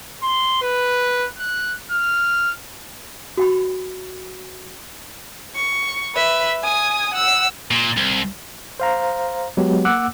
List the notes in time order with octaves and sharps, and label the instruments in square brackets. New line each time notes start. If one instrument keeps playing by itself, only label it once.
[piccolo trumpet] C6
B4
F#6
F6
[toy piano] F#4 G5 B5
[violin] C#6
B4 E5
G#5 D#6
F#5 E6
[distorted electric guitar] A#2
C2
[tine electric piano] C5 F5 A#5
F#3 G#3 B3 G4
A#3 F#5 D6 E6 F#6